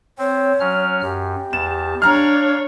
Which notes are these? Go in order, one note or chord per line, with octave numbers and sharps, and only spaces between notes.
C4 C#5
F#3 C#4 F6
F#2 G4
E2 A5 E7
D4 C#5 F5 A#5 F6